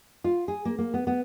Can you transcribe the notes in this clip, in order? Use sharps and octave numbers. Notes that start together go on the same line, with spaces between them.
F4
G#4
A#3
A#3
B3
B3